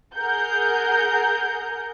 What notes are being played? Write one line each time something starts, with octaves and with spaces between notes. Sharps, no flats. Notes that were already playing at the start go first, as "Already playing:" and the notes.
G#4 A#4 F#5 G6